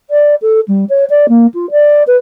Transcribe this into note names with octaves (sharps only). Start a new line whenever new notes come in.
D5
A4
G3
C#5
D5
A#3
F4
D5
B4